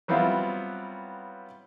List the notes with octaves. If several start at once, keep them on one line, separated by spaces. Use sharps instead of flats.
F#3 G3 B3 C4 E4 F4